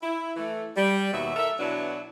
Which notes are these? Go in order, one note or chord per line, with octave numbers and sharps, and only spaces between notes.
E4
E3 A3
G3
D#2 B2 F#3 E5
A4 A#4 E5
B2 E3 F#3 D4 E4